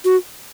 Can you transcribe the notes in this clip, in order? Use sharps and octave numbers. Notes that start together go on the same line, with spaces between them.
F#4